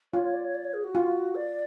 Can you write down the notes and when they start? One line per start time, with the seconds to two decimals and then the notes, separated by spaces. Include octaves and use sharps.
0.13 F4 C#5
0.24 C#5
0.34 D5
0.44 C#5
0.55 D5
0.65 C#5
0.74 G#4
0.84 F#4
0.95 F4
1.35 D5